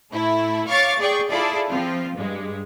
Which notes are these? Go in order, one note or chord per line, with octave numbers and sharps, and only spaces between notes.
A2 A3 E4
C#5 F5 C#6 D6 A6
G#4 D5 G5 C#6
E4 F4 G#4 A4 D5
F3 C4 F4
G2 G#3